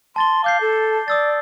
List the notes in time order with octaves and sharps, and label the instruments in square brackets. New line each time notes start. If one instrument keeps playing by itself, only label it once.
[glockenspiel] A5 A6 G7 [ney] C6
[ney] F5 [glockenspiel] D6 G6 C7
[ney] A4
[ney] D5 [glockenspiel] D#6 E6 A6